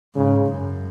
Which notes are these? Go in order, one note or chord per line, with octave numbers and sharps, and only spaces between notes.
G#2 C#3
F#2